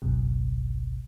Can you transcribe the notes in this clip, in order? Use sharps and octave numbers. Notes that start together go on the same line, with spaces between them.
G#1 C#2 F#2 B2